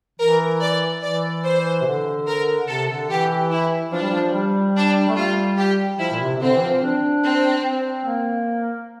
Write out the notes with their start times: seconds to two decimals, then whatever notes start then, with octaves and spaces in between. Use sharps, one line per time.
0.19 E3 A#4
0.61 D5
1.02 E3 D5
1.44 C5
1.82 C3
1.85 D3
2.27 A#4
2.68 C3 A4
2.89 D3
3.09 E3 G4
3.51 E4
3.92 F3 D4
4.02 G3
4.10 F3
4.33 G3
4.76 D4
5.09 A3
5.16 G3 F4
5.57 G4
5.99 F3 E4
6.12 A#2
6.20 C3
6.36 C3
6.41 D3 C4
6.55 E3
6.61 F3
6.83 D4
7.24 C4
7.65 C4
8.06 A#3